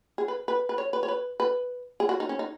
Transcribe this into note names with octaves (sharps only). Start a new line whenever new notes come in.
G#4
B4
B4
B4
C#5
B4
C#5
B4
B4
G#4
F#4
D#4
C#4
D#4